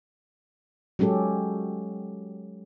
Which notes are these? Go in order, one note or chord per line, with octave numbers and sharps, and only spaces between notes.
F#3 G#3 C#4 G4 A4